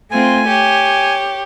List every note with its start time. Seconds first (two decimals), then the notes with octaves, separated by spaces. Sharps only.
0.11 A3 C4 F4 G#5
0.47 G4 C#5